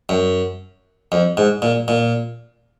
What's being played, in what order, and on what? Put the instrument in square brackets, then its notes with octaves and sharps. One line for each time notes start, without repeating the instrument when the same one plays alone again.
[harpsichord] F#2
F2
G#2
A#2
A#2